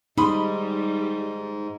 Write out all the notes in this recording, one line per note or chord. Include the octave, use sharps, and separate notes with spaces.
G#2 G3 D#4 B5 C6 D#6